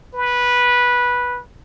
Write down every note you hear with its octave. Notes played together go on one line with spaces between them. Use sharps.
B4